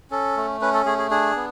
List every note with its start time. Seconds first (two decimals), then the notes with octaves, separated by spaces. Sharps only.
0.11 C#4 A4
0.37 A3
0.61 C#4 B4
0.73 A4
0.85 A3 G#4
0.99 G#4
1.11 D4 G#4
1.36 B3